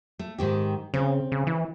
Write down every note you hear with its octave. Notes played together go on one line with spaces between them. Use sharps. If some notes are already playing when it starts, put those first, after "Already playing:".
A3
G#2 D#3 G4
C#3 C4
C#3
E3